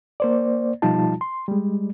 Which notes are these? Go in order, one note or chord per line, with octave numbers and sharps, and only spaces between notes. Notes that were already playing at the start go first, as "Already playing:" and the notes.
A#3 C5 D5
B2 F3 G3 D#4 F4 A5
C6
G3 G#3